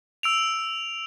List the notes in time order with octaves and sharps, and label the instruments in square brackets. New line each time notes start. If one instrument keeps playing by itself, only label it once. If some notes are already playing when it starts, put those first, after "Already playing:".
[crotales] E6 D7 F7